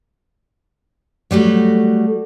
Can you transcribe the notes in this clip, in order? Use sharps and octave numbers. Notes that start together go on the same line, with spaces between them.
F#3 G3 A3 F#4